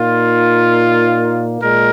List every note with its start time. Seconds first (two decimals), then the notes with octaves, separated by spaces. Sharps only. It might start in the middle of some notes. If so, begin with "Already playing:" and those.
Already playing: A#2 A#3 D#4 F4
1.61 A#2 G#3 A#4